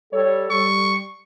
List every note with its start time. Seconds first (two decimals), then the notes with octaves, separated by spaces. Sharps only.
0.13 G3 A4 C#5
0.51 G3 C#6